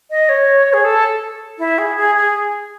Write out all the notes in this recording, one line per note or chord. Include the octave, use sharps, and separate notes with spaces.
D#5
C#5
G#4
A4
E4
G#4
G#4
G#4